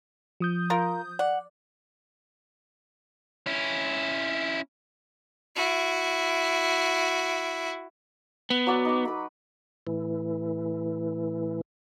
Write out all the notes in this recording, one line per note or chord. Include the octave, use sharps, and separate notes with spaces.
F3 D#6 G6
F4 A#4
D5 F#5
C#4 E4
E4 F#4
B3
F#3 F#4 D5
D#4 D6
B4 B5
A2 E3